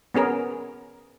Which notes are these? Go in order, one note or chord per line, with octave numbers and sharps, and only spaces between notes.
B3 C#4 G#4 A#4